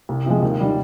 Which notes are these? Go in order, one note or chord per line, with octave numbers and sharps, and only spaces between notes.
C2
C3 F3 G#3
D#2
D#3 G3